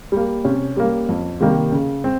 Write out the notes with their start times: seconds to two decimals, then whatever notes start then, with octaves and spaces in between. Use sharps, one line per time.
0.12 G3 A#3
0.45 C3 C#4
0.77 G3 A#3
1.09 F2
1.40 C3 D#3 G3 A#3
1.72 C#3
2.04 C4